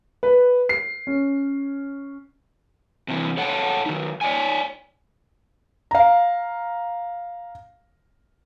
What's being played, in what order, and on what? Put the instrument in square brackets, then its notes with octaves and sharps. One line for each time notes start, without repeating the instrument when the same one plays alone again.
[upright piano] B4
C7
C#4
[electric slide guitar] C3 E3
A4 C#5 F#5 G5 A5
D#3 F#3 D#4
C#5 D5 E5 G5 G#5
[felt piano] F5 A#5